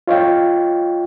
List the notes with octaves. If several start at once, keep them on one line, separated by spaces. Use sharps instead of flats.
F4 C#5 D#5 F5 G5